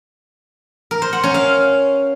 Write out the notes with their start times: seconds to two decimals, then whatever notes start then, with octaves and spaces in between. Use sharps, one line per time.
0.91 A#4
1.02 C5
1.13 F#5
1.23 C#4
1.34 F5